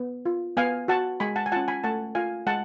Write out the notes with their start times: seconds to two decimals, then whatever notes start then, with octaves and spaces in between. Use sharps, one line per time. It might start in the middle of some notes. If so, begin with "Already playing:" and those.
Already playing: B3
0.26 F4
0.57 B3 F5 G#5
0.88 F#4 F#5 A5
1.20 G#3 G#5 B5
1.36 F#5 A5
1.46 G#5
1.52 C#4 F4 F#5 A5
1.68 G#5 B5
1.84 A3 F#5 A5
2.15 F4 F5 G#5
2.47 G#3 F#5 A5